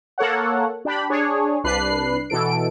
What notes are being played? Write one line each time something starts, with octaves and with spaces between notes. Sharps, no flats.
A#3 A4 C#5 F#5
D4 G4 B5
D4 G#4 C#5
C2 D4 B4 F#6 C7
B2 E3 A4 D7